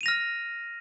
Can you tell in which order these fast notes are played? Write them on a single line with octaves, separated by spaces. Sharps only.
D#7 F7 A#6 F6